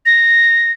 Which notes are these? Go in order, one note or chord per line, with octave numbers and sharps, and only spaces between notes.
A#6